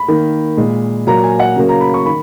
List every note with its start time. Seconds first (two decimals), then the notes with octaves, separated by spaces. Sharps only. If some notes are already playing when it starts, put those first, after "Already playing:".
Already playing: B5
0.08 D#3 A#3
0.57 A#2 G#3
1.07 A#2 F#3 A#3 A#5
1.24 G#5
1.39 F#5
1.56 C#3 F#3 A#3
1.69 A#5
1.81 B5
1.94 C#6
2.06 D#3 B5